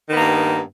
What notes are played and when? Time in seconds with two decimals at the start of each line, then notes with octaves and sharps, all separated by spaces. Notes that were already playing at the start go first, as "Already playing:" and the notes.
0.10 D#3
0.13 B3
0.16 A#3
0.20 G2